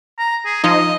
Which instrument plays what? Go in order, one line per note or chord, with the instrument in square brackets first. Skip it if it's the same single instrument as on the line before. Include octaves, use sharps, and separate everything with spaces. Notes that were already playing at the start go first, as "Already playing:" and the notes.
[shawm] A#5
G#4
[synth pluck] F3 D#4 [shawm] D#5